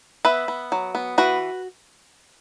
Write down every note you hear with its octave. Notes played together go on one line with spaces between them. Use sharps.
B3 B4 E5
B3
F#3
B3
E3 F#4 B4